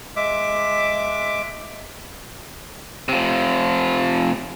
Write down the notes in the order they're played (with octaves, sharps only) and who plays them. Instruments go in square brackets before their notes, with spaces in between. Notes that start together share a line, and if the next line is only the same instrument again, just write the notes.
[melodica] G#3 E5 D6
[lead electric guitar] C3 F3